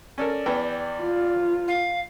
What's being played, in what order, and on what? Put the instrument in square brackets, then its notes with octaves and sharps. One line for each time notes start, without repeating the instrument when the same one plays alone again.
[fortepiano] C#4 A4 A#4 [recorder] D5
[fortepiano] E2 B3 G5
[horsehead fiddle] F4
[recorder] F5